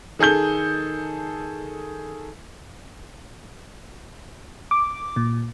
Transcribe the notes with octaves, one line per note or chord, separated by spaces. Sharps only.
D#3 G#4 A4 G6 G7
D6
A#2